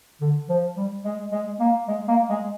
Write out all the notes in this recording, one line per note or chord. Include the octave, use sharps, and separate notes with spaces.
D3
F3
G3
G#3
G#3
A#3
G#3
A#3
G#3